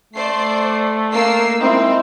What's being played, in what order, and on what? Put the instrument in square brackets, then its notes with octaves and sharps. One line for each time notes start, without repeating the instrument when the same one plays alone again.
[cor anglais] A3 [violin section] C5 D5 C7
[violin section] A#3 E6 C7
[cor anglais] G#3 [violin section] C4 [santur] D#4 E4